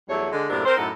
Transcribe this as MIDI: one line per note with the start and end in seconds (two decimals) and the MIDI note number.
0.08 0.26 40
0.08 0.26 54
0.08 0.26 55
0.08 0.26 57
0.08 0.26 73
0.31 0.46 50
0.31 0.46 56
0.49 0.62 42
0.49 0.62 45
0.49 0.62 48
0.49 0.62 58
0.49 0.62 62
0.65 0.75 60
0.65 0.75 70
0.65 0.75 72
0.77 0.89 42
0.77 0.89 45
0.77 0.89 63
0.77 0.89 69
0.77 0.89 78